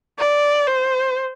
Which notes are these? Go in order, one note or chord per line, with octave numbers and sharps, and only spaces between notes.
D5
C5